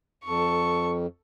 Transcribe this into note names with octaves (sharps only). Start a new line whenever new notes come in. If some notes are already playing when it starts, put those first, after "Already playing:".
F2 A4 C#6